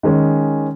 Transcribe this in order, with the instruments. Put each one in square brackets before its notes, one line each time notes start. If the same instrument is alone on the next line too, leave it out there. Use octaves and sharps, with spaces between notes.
[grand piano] D#3 G#3 C#4